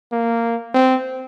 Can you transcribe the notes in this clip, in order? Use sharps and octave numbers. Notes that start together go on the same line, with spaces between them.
A#3
C4